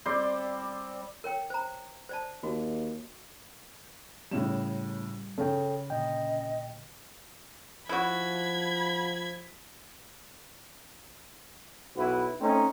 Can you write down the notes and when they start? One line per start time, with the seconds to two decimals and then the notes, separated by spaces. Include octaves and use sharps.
0.06 G3 C4 D5 C6
1.24 A#4 C#5 G5
1.50 C5 A#5
2.09 C5 D5 A5
2.43 D#2 F#4
4.31 A2 C#3 G3 E7
5.38 C#3 A4 C#5 G5
5.90 A#2 D3 D#5 G5
7.89 F3 E4 F#4 B5 G#6
11.96 B1 F#3 E4 B4
12.40 A3 C4 C#4 D#4